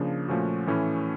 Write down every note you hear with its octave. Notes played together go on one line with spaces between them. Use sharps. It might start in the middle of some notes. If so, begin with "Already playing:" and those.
Already playing: C#3 F3 A#3 D4
A#2 F3 A3 C#4 F#4
A2 E3 A3 C#4 E4